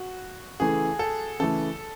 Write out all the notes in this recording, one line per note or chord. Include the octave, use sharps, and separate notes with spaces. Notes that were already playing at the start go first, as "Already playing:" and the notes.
Already playing: F#4
C#3 E3 A3 G#4
A4
C#3 E3 A3 A4